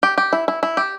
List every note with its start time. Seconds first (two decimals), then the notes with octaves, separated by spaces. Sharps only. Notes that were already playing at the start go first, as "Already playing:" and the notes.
0.03 G4
0.18 G4
0.33 E4
0.48 E4
0.63 E4
0.77 G4